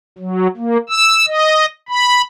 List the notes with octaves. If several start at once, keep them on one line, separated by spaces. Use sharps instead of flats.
F#3
A#3
E6
D#5
B5